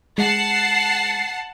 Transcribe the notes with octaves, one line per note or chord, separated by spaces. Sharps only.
G#3 F#5 A5 C7